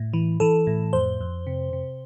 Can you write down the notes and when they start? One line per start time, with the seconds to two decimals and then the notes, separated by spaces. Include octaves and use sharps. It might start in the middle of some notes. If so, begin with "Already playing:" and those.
Already playing: A2
0.13 E3
0.40 E3 A4
0.67 A2
0.93 F2 C5
1.21 F2
1.47 C3
1.73 C3